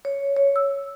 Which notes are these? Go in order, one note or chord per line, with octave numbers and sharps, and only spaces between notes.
C#5
C#5
E6